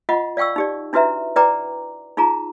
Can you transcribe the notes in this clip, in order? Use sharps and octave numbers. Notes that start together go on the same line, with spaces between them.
F4 D#5 F#5 B5
D5 F5 G5 C#6 E6
D#4 G4 D5
D4 E4 F#4 B4 E5 A#5
E4 B4 D5 G5 A#5 D6
D#4 F4 G#4 A#5